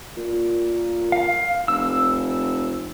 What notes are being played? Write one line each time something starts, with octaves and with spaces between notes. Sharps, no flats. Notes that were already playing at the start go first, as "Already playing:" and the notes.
A#2
F5
F1 E6